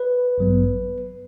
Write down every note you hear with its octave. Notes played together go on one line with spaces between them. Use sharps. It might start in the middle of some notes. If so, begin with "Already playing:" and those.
Already playing: B4
A1 G2 F#3 B3